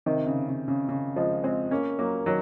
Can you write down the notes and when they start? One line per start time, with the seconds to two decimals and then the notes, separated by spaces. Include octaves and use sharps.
0.06 C3 D#3
0.27 C#3
0.48 C#3
0.68 C#3
0.89 C#3
1.16 F3 G#3
1.44 G#3 C4
1.71 A#3 C#4
1.99 F#3 A#3
2.26 D#3 F#3